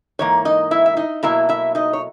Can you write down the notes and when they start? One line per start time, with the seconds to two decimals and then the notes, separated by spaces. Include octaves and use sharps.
0.19 G#2 E3 A#3 C#5
0.45 D#4 D#5
0.71 E4 E5
0.86 E5
0.97 D#4 D#5
1.23 B2 F#3 A#3 E4 E5
1.49 E4 E5
1.75 D#4 D#5
1.93 C#5